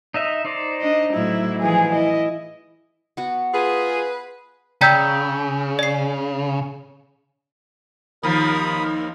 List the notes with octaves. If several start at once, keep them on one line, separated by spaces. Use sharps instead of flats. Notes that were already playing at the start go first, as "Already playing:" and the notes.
D#4 D#5 E5
D#4 C5 D5
D4 D#5
A2 F#3 E4
E3 F3 G#4
E4 D#5
B3 F#4
F4 G#4 B4
C#3 D5 G5 A#5 E6 G6 B6
D5 C7
D#2 D#3 F3 A#4 B5 D#6